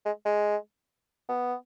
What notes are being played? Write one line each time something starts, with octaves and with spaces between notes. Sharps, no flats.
G#3
G#3
B3